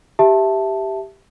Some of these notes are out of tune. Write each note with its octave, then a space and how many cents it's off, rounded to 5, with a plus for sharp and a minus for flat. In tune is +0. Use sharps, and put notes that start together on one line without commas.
G4 +0 E5 +0 A5 +0